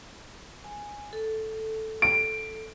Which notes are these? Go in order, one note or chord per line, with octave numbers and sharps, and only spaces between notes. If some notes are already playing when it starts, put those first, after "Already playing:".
G#5
A4
D7